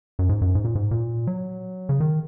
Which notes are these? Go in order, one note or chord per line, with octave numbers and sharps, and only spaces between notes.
F#2
G#2
F#2
G#2
A#2
G#2
A#2
F#3
C#3
D#3